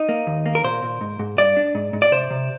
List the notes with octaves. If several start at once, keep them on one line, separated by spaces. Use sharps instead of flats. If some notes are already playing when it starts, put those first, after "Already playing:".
Already playing: D#4
A#3
D#2
A#3
A#4
A#2 C5
A#2
G#2
G#2
G2 D5
D4
G#2
G#2
D5
C3 C5
C3